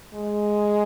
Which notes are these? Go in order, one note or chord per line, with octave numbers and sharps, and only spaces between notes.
G#3